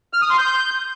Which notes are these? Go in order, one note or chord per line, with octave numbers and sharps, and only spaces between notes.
F6
D#6
C6
G6